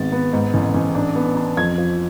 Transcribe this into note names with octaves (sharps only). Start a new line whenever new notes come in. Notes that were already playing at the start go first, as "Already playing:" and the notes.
Already playing: G#1 G#3 B3 A6
B3
G#2
A1
A1
D4
B3
D4
F2 G#6
F3